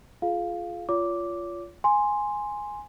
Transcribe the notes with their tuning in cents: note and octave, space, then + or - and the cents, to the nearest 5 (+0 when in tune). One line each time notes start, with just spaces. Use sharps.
F4 -5 G#4 +30 F5 +0
F4 -10 C#5 +40 D6 -5
G#5 +0 C6 +0